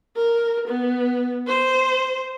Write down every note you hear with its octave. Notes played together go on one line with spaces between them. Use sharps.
A#4
B3
C5